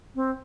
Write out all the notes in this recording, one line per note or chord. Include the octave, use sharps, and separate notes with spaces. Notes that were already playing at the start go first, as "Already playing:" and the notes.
C4